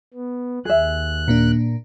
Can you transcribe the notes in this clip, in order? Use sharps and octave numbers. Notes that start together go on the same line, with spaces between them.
B3
D#2 G#4 E5 F#6
A#2 A#3 D4